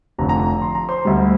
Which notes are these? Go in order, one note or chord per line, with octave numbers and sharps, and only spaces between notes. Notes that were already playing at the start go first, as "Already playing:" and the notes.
F1 F2 D3 F3 A#5
A#5
A#5
C6
A#5
C5 C6
D2 D3 G3